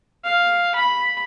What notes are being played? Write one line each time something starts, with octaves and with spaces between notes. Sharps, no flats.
F5
B5